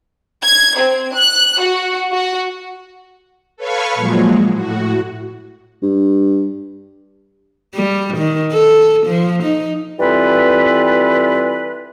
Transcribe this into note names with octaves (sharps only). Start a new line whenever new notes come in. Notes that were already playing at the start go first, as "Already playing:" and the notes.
G#6
C4
F#6
F#4
F#4
A4 B4 C#5 F5 B5 C#6
A#2 F3 F#3 G#3
A2 F#4
G2
G3
D#3
A4
F3
D#4
E3 G3 C4 F4 A4 B4